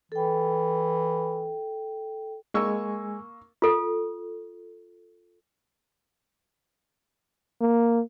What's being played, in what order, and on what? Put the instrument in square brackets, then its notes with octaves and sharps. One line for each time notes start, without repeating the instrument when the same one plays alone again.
[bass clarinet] E3 [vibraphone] A4 G5
[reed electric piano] G#3 G#5 [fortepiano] A#3 C#6 E6
[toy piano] F4 A4
[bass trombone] A#3